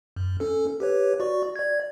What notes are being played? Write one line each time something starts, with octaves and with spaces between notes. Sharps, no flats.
F#2
C#4 A4
G4 B4 C#5
F#4 D5 C#6
D5 G#6